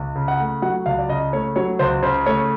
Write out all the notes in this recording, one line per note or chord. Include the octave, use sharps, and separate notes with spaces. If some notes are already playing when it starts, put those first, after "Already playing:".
Already playing: C#2
C#3
F#5
A3
F#3 F#5
C#2 F5
D5
C#3 D#5
A3 C#5
F#3 C#5
C#2 C5
C#3 C5
A3 C#5